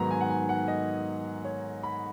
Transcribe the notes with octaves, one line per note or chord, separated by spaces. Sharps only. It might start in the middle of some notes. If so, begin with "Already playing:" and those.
Already playing: G#2 D#3 F#3 B3 A#5
G#5
F#5
G#5
F#5
D#5
C#5
B5